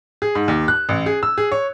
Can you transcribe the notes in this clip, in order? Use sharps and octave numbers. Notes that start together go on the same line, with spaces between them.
G#4
G#2
D#2
F#6
A1
G#4
E6
G#4
C#5